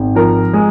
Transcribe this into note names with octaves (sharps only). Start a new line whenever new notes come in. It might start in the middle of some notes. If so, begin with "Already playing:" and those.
Already playing: G#1
F3 A#4
G#3